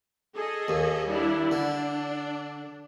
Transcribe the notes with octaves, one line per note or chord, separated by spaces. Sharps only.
G#4 A4 D#5
D#2
G3 D4 E4
D3 D4